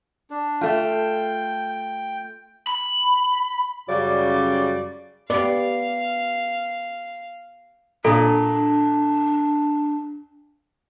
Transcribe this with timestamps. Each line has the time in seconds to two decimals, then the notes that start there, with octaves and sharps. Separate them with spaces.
0.30 D4
0.61 A3 F4 G5
2.67 B5
3.88 F#2 C#3 G3 D5
5.30 B3 G4 D5 F5
8.05 A#2 D4 A4 D#6